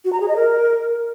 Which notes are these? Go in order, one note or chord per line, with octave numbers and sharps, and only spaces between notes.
F#4
A#5
G#4
D#5
A#4